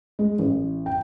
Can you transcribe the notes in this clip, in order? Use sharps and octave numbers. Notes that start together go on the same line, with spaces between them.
G#3
A1
G5